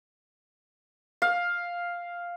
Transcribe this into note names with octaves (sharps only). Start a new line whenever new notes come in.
F5